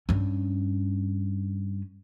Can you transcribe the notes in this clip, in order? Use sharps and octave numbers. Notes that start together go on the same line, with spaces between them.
G2 C#4